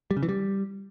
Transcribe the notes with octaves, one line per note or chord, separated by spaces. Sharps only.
G3
C#3
E3
G3